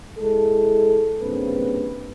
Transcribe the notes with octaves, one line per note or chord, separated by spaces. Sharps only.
G#3 E4 A4
G2 C#3 A#3 C4 B4